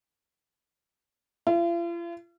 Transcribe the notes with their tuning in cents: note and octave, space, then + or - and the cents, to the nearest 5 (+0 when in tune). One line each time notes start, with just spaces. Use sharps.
F4 -45